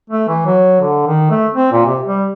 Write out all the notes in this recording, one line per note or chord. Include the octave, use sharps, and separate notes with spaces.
A3
E3
F#3
D3
D#3
A3
C4
A#2
C3
G3